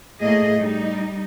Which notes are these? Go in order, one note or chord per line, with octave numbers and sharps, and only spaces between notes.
A2 A3 A#3 G#4 D#5
G3 D#4